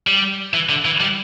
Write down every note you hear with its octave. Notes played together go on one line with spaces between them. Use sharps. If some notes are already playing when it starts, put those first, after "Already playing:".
G3
E3
D3
E3
G3